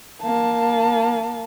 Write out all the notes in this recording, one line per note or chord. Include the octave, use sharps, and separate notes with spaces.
A#3 A5